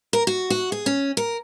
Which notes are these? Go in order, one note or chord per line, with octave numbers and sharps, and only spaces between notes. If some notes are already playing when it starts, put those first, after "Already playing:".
A#4
F#4
F#4
G#4
C#4
A#4